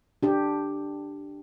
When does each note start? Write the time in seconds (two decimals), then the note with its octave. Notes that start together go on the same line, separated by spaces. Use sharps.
0.23 D4 G4